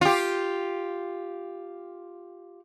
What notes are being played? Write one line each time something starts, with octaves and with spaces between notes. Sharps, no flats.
F4 G4